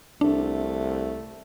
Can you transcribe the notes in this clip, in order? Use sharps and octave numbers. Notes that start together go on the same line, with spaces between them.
C2 A3 D4